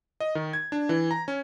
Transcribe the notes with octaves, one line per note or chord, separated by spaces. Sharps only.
D#5
D#3
G#6
D4
E3
A#5
C#4